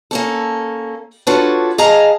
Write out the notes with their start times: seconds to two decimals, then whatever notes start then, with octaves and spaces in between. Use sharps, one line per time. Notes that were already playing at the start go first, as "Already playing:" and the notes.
0.11 A#3 C#4 A4
1.27 D4 F4 F#4 A4 B4 C#5
1.78 G#4 D#5 F5 A5 A#5